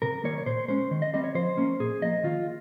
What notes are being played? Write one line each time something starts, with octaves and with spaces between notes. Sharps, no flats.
C3 A#4
D#3 G3 A#3 C#5
C#5
A#2 C5
G#3 C#4 C5
D#3
D#5
G3 C4 D#5
C#5
F3 C5
A#3 C#4
A#2 G#4
F3 A#3 D#5
D#3 F4